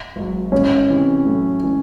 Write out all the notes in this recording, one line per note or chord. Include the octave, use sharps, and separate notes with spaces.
G#1 G#2 F#3
A1 G#2 D#3 G#3 C#4
C3 E3 C4
A2 F#3 A3
E3 G#3 C#4